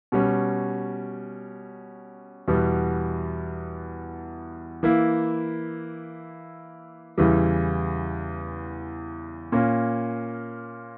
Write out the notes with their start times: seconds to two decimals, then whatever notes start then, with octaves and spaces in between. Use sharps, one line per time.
0.12 B2 G3 C#4
2.48 E2 B2 G3 B3
4.83 E3 A#3 E4
7.18 E2 C#3 E3 G3
9.52 A#2 A#3 C#4